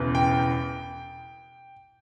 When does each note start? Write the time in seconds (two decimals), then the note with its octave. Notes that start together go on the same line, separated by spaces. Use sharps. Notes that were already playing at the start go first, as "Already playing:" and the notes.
Already playing: E1 E2 C#3 E3
0.15 G5